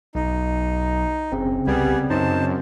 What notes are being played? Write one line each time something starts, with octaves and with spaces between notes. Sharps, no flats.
B1 D#4
F#1 C#3 C4
C2 G3 B3 G#4
F#2 D#4 C5 A5